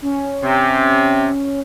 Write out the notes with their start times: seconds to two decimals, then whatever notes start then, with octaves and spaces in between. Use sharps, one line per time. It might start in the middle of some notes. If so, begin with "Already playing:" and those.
0.02 C#4
0.44 C3